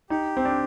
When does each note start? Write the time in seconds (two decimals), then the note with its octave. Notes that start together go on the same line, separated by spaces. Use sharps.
0.10 D#4 G4
0.37 C4
0.45 D4